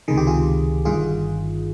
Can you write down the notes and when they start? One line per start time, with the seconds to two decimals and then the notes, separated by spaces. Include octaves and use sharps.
0.08 C#2 C3 D#3 G#4
0.17 G4
0.27 F4 G#4
0.85 G1 G2 D#3 F4 G#4